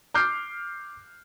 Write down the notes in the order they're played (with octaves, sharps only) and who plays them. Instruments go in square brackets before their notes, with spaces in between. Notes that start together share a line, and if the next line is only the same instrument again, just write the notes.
[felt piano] D6 F6 G6 C7